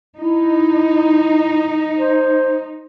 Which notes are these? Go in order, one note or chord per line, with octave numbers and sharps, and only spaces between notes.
D#4 E4
C5